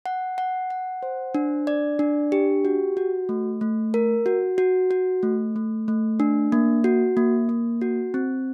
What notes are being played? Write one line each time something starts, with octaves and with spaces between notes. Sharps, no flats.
F#5
F#5
F#5
C5
D4
D5
D4
G4
F#4
F#4
A3
A3
A#4
F#4
F#4
F#4
A3
A3
A3
D4
A#3
F#4
A#3
A#3
F#4
C4